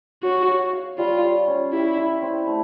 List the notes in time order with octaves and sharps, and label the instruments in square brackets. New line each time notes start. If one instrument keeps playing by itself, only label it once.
[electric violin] F#4 [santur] C#5
[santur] C#5
F5
[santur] G3 [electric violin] F4
[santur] G3
C#4
[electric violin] E4 [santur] G4
[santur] E4
C4
A3